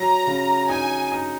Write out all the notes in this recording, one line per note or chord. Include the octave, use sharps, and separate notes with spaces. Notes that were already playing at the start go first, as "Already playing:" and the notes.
Already playing: F#3 A#5
C#3
D#4 G#5
D#4